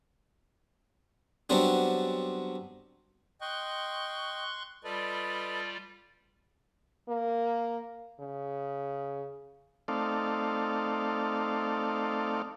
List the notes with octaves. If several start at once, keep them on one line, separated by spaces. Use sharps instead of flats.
F#3 G3 B3 C4 D4
D#5 G5 C6 C#6 F#6
G3 F4 A4 B4 D5 D#5
A#3
C#3
A3 C4 D#4 A4 D5 F5